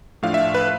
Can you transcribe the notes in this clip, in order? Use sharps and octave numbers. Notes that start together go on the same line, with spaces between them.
A2 F3 A3 D4 F5
E5
B4